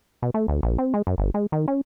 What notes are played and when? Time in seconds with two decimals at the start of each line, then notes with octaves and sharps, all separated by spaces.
0.22 B2
0.34 A3
0.48 D2
0.63 A#1
0.78 C4
0.94 G#3
1.07 F#2
1.18 G1
1.34 G#3
1.52 D#3
1.68 C#4